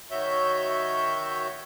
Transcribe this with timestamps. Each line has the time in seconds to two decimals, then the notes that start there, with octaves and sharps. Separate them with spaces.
0.11 D#3 F#4 C#5 E5 G6